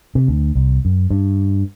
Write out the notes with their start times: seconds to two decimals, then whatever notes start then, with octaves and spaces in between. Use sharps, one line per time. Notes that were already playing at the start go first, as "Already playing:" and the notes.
0.15 C3
0.28 D2
0.55 C2
0.85 F#2
1.10 G2